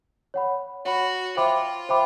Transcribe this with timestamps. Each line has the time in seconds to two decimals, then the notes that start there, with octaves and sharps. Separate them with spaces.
0.34 C#5 F#5 B5
0.85 F#4 C#5 F#5 B5
1.37 F4 C5 E5 G5 B5 D6
1.89 C5 E5 G5 B5 D6